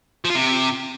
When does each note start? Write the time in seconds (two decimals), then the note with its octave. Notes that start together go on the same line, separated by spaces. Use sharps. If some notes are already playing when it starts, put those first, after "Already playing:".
0.25 F3
0.30 F4
0.35 C3